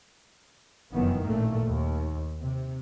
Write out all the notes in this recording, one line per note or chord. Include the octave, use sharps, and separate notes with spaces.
F1 F#2 D#3 E3 B3
A1 A#2 A3 A#3
D#2
C3